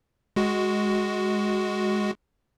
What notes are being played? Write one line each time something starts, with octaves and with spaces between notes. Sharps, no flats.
G#3 F#4